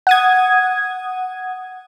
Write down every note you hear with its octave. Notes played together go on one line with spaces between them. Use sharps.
F#5 D#6 G#6